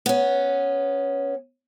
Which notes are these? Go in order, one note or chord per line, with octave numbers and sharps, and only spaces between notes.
B3 C#4